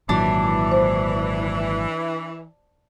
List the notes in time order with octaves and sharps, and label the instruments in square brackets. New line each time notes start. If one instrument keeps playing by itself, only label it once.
[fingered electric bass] G#1 A#2 F#3 [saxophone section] E3 [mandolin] D4
[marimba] C5